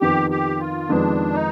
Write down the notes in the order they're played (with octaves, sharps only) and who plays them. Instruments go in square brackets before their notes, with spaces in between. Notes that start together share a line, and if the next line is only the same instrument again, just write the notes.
[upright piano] F2 D#3 B3 [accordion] G4
[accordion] G4
F4
[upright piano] F2 D#3 G#3 B3 [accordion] D4
[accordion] D#4